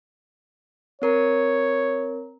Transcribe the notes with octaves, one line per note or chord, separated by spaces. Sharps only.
C4 A#4 C#5 A#5